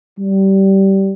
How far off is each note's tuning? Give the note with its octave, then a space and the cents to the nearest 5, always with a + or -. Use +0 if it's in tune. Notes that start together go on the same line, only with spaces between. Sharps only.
G3 -20